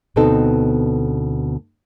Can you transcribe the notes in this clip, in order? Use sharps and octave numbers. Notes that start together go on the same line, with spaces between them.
D2 B2 B3 C4 D#4 A4